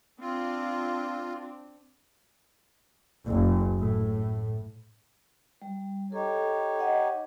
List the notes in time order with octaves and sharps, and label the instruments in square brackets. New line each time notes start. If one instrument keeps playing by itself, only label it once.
[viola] C4 D4 [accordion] F4
[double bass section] F#1
A2
[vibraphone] G3
[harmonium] D#4 G4 C#5 [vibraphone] A4
[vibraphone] D#5 F#5